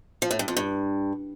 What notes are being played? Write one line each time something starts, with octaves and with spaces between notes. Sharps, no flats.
F3
A2
G2
F2
G2